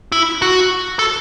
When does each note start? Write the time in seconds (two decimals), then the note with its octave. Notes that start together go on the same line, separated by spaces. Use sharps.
0.12 E4
0.42 F#4
0.99 A4